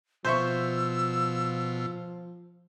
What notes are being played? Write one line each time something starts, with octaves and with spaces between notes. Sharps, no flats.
B2 F3 F4 C5 E5 C#6 E6